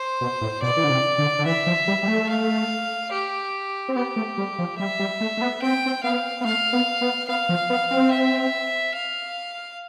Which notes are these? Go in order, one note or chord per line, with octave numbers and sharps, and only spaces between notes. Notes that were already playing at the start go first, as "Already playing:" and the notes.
Already playing: C5
B2
A2
B2 D5
E3
D3
C3
D3
D3
E3 E5
F3
G3
G3
A3
F5
G4
C4
B3 G4
A3
G3
F3
G3 E5
G3
A3
A3
B3
C4 G5
C4
B3 F5
B3
A3 F5
B3
B3
B3 F5
F3
B3
C4
E5
F5